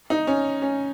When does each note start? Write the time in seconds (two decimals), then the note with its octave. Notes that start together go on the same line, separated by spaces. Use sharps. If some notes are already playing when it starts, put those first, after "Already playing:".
0.10 D#4
0.27 C#4
0.62 C#4